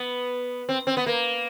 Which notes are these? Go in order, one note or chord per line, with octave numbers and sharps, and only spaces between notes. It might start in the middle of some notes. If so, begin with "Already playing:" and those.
Already playing: B3
C4
C4
B3
A#3